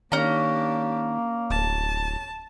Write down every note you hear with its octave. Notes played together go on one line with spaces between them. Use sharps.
D#3 A#3 C#4 D4 G4 A#5
D1 A5